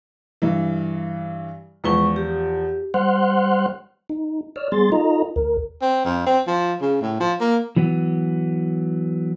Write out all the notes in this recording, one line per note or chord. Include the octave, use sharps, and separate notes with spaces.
G2 E3
E2 F3 G#3 B4 C#6 G7
G4
G3 C5 F#5 C6 F6 F#6
D#4
C#5 D5 E6 F6
G3 B3 G#4 C6 A6
D#4 F4 A4 D#5 A#5
D2 A#4
C4
F2
C4
F3
C#3
A2
F3
A#3
E3 F#3 B3